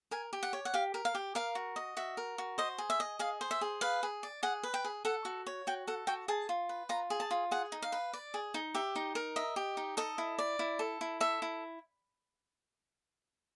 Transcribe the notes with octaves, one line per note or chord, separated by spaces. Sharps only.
A#4 G#5
G4
F#5
C#5
F#5
G4 F5
A#4
F5
G4
A#4 F5
F#4
D#5
F#4 E5
A#4
F#4
C5 D#5
G#4
E5
D#5
G#4 F5
C5
E5
G#4
B4 F5
G#4
D5
G#4 F#5
B4
G5
G#4
A4 F#5
F#4
C#5
F#4 G5
A4 F#5
F#4 G5
G#4 A5
F4
B4
F4 A#5
G#4
A5
F4
G#4 F#5
D#4
F5
B4
D5
G#4
D#4
G4 E5
D#4
A#4
D#5 E5
G4
D#4
A4 D#5
E4
D5
E4
A4
E4
A4 E5
E4